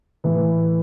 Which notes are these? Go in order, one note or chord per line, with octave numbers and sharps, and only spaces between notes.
A2 E3